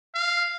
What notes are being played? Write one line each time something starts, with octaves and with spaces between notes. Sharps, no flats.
F5